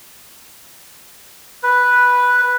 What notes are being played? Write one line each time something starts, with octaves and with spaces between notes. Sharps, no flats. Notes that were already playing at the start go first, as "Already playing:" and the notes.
B4